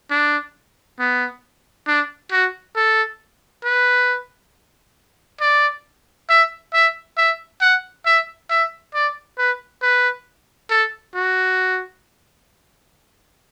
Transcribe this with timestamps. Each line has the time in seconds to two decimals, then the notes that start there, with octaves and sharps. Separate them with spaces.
0.10 D4
0.99 B3
1.87 D4
2.32 F#4
2.76 A4
3.64 B4
5.41 D5
6.29 E5
6.73 E5
7.17 E5
7.61 F#5
8.06 E5
8.50 E5
8.94 D5
9.38 B4
9.82 B4
10.70 A4
11.15 F#4